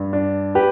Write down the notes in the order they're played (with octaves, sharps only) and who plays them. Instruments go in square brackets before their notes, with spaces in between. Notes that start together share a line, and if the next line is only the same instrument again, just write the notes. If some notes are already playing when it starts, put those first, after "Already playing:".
Already playing: [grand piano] G2
D4
G4 B4